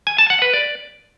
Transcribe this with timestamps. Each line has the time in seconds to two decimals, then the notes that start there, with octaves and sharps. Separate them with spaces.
0.07 G#5
0.18 A5
0.30 F#5
0.42 B4
0.54 D5